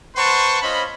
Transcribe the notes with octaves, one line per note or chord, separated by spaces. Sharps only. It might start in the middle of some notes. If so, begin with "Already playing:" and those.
B4 C5 F#5 A5 C6 C#6
C#4 F4 C5 D#5 B5